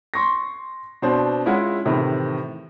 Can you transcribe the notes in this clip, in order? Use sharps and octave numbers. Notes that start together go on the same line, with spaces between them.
C6 C#6 A#6
B2 C4 D4 C5
G#3 C#4 E4 F4 E5 F#5
A2 C3 D#3 E3